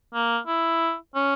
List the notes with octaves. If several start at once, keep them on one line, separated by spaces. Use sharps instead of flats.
A#3
E4
C#4